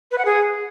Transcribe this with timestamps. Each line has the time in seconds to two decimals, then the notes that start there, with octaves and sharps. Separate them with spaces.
0.11 B4
0.18 F#5
0.25 G#4